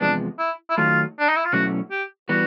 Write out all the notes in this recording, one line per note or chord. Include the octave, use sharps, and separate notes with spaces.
E2 C3 F3 G#3 B3 D4
E4
E4
D#3 F#3 A3 F4
D4
D#4
E4
F4
B2 F#3 A3 C#4 E4 F#4
G4
E3 G3 B3 F#4